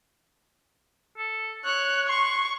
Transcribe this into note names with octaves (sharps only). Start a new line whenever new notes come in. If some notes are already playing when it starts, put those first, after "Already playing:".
A4
C#5 F#6
C6 C#6